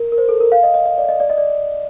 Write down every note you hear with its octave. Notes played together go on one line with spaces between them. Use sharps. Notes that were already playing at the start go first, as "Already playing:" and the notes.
Already playing: A#4
A#4
C5
A4
A#4
F5
D#5
D#5
D#5
D5
D#5
D5
D#5
D5